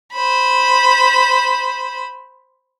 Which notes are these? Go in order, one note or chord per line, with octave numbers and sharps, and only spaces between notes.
C5 B5